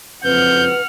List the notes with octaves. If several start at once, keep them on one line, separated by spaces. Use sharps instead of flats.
F#1 F2 C4 B4 F#5 F6 G6